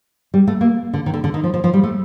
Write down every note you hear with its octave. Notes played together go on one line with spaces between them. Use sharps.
G3
A3
A#3
D3
D#3
D3
D3
D#3
F3
F3
F3
G3
A3